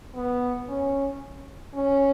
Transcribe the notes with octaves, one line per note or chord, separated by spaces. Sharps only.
B3
C#4
C#4